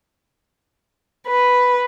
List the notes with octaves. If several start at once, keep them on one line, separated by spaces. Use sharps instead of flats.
B4